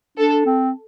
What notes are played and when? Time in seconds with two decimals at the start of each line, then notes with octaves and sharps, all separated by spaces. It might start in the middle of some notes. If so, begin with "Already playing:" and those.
0.18 D4 A4
0.46 C4